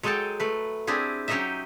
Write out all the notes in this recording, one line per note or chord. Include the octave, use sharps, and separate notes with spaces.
F#3 G#3 G#4 A4 G5 A5
A3 B4
C4 D4 E4 G4 G#4
F#3 C#4 D#4 G4 D#5 E5